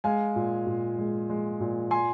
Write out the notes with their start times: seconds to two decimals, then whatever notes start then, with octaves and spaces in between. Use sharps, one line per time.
0.04 G#3 F5 G#5
0.36 A#2
0.67 A#2
0.98 G#3
1.30 G#3
1.60 A#2
1.91 G#5 C6